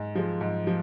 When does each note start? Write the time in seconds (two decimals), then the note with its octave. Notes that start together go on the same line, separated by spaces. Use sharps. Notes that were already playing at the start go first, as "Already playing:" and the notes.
Already playing: G#2
0.15 F3 G#3
0.41 G#2
0.67 F3